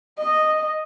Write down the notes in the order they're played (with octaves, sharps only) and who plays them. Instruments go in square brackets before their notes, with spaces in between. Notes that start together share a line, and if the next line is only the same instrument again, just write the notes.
[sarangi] D#5